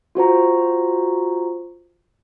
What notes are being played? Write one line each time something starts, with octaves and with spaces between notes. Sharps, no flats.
F4 F#4 C5 A#5